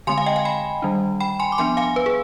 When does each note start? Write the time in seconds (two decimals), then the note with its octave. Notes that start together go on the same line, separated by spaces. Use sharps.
0.07 D3 G#3 C4 G#5 C6
0.18 F5 G#5
0.26 D#5 G5
0.36 F5 G#5
0.45 G5 B5
0.82 D#3 G3 D4
1.20 G5 B5
1.40 G#5 C6
1.52 D6
1.58 F3 B3 D4 G#5 C6
1.77 F5 G#5
1.96 B4
2.06 G#4